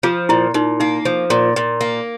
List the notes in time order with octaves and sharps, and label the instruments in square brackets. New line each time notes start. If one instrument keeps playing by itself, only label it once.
[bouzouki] F3 [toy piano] F4
[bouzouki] A#2 [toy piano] E4
[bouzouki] A#2 [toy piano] D#4
[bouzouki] A#3 [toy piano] D#4
[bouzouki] F3
A#2
A#2
A#3